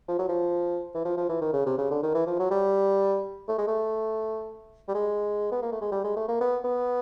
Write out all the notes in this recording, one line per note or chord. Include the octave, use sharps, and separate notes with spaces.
F3
F#3
F3
E3
F3
F3
E3
D#3
C#3
C3
C#3
D3
D#3
E3
F3
F#3
G3
A3
G#3
A3
G3
G#3
B3
A#3
A3
G#3
G3
G#3
A3
A#3
B3
B3